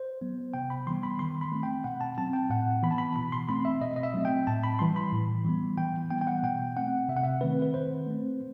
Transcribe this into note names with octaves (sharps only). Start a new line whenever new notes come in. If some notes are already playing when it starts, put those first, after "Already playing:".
Already playing: C5
F#3 B3
C3 G5
B5
E3 G3 B3 C6
B5
D#3 C6
B5
A3 C4
G5
B2 F#5
A5
F#3 C4 A5
G5
A2 F#5
E3 B3 B5
A5
B5
B2 B5
C6
A3 C4 B5
E5
B2 D#5
D#5
E5
F#3 A3 C4
G5
A2 A5
B5
E3 G3 C6
B5
A2
E3 G3 B3
E3 G5
G3 B3 G5
G5
F#5
B2 G5
A3 C4 F#5
C3 E5
F#5
E5
D#3 A3 C4 B4
B4
D#3 C5
A3 C4